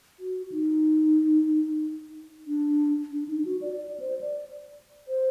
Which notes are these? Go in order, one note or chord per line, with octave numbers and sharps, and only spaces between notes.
F#4
D#4
D4
D4
D#4
F#4
D5
D5
C5
D5
C5